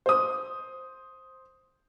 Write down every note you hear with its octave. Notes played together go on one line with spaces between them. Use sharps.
C5 D#6